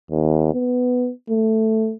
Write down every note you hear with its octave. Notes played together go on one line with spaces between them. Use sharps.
D#2
B3
A3